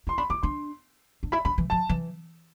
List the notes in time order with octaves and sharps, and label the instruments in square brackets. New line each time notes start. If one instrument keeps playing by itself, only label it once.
[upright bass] E4 [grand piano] C6
[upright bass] D4 [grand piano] B5
[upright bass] E4 [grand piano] D6
[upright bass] D4 [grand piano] C6
[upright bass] D4
[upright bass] E4 [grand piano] B5
[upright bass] D4 [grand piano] B5
[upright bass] E3
[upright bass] F3 [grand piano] A5
[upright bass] E3